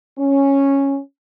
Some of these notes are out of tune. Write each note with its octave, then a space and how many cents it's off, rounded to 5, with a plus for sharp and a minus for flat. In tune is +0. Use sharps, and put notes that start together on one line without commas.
C#4 -5